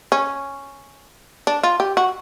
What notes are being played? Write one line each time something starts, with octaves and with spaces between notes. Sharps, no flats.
C#4
D4
F4
G4
F#4